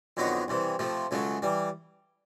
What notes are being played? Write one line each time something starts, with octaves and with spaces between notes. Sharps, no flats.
F2 D3 F#3 B3 D#4
C2 C3 E3
C3 F3 A3
C#2 C#3 F#3 A3
E3 G3